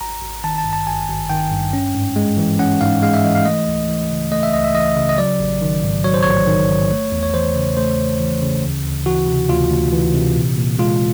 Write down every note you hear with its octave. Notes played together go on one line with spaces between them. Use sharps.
G#1 A#5
G#1
D#3 A5
A5
G2
A5
G#1 G#5
G#1
D#3 G5
G2
C#4
G#2
G#3
E3
C#4 F#5
G#2 F5
G#3 F5
E5
E3 D#5
F5
A3 D#5
C#2
E3
C#3
A3 D#5
E5
C#2 D#5
E5
E3 D#5
C#3
D#5
F#3 D5
A1
D#3
G#2
F#3 C#5
C5
A1 C#5
D#3
G#2
A3
E2
C#5
E3 C5
C#3
A3 C5
E2
E3
C#3
D2
D2
E3 F#4
C3
D2 F4
D2
E3
C3
A#2
A#2
G#3 F4